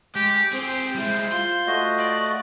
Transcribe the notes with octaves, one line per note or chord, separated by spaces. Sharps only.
G#3 G4
C4 G4 G#4 C5
G3 G#3 E4
F4 C6
A3 F#4 D#5
D5